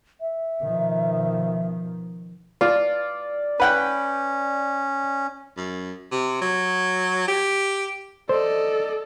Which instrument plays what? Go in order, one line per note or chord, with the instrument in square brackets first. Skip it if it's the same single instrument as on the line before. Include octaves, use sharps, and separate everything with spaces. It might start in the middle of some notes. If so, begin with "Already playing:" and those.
[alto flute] E5
[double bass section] B2 D#3 F3
[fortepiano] F4 [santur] D5
[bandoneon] C#4 [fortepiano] B4 F#5 G5
[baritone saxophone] F#2
C3
F#3
G4
[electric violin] A4 [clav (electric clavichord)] C5 [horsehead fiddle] D5 D#5